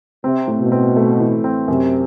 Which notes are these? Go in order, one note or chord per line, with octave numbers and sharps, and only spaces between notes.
C3 C4
A2
B2
C4
A3
E3
C4
F#2 C3